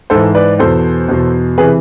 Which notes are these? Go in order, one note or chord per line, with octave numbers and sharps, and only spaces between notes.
G#2 E3 A4 C5
B4 D5
E2 B2 A4 C5
E2 B2
C3 E3 G#4 B4